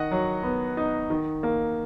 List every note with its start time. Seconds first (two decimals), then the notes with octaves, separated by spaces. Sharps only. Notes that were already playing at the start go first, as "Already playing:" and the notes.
Already playing: D#3 D#5 F#5
0.11 F#3
0.43 B3
0.77 D#4
1.10 D#3
1.43 A#3